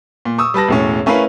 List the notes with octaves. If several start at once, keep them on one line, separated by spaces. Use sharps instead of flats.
A#2
C#6 D#6 E6
G3 B4 A5 A#6
E1 A2 C#4
A3 C#4 E4 A#4 B4 F5